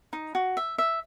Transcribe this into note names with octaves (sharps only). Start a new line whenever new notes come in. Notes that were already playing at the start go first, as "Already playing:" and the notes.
D#4
F#4
E5
E5